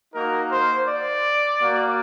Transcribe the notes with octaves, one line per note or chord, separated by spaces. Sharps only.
A#3 D#4 F#4 A#4
C5
D5
A#3 F#4